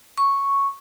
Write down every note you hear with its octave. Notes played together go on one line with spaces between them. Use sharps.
C#6